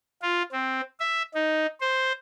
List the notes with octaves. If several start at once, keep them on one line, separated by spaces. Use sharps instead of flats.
F4
C4
E5
D#4
C5